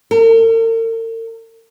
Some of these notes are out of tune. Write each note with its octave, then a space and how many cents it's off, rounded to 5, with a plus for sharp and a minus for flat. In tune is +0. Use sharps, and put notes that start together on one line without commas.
A#4 -45